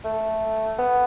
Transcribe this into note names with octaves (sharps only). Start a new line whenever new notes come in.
A3
B3